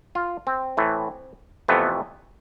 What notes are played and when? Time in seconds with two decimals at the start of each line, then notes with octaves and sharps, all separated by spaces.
0.15 F4
0.47 C4
0.77 A2 E3 A3
1.68 F2 C3 E3 A3 B3